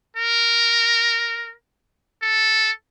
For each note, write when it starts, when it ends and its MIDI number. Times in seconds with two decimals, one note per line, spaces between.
0.17 1.54 70
2.23 2.71 69